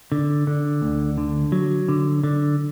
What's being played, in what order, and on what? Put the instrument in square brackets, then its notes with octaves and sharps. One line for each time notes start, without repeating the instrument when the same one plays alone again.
[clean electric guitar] D3
D3
D2
D3
F#3
D3
D3